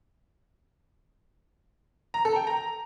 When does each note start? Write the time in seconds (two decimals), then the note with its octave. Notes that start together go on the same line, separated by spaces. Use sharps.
2.14 A#5
2.25 A4
2.36 G5
2.47 A#5